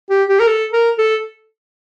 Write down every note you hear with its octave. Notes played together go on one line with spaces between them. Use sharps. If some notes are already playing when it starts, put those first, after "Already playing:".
G4
G4
A#4
A4
A#4
A4